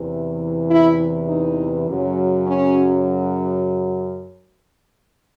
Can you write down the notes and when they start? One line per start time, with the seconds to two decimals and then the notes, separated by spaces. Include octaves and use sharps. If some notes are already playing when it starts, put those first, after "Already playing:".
Already playing: E2 C3 E3
0.69 E4
1.28 D#4
1.87 F#2 C#3 F#3
2.45 C#4